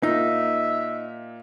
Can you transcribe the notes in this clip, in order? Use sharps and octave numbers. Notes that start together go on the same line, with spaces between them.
A#2 D#4 E5